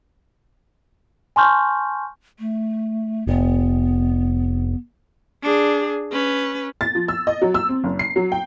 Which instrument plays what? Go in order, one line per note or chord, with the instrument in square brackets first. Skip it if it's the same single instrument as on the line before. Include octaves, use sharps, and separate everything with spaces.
[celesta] G#5 A5 C6 C#6 F6 G6
[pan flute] A3
[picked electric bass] F1 [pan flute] B3
[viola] D4 G#4
C#4 B4
[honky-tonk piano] A6
F3
E6
D#5
F#3
E6
C4
F#1
C7
F#3
G5